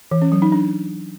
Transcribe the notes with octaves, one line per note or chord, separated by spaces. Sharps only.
E3
C#4
F#3
D#4
D4